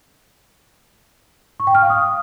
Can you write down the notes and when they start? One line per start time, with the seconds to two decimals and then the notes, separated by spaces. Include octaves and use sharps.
1.60 C#6
1.67 G5
1.75 F6
1.82 F5
1.90 D#6